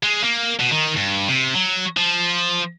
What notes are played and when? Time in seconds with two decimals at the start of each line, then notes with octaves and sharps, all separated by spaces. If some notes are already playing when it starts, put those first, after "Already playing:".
0.03 G#3
0.24 A#3
0.60 B2
0.72 D#3
0.97 G2
1.28 C3
1.54 F#3
1.97 F3